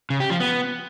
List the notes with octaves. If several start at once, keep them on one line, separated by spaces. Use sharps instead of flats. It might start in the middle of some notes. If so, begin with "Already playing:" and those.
C#3
G4
F3
B3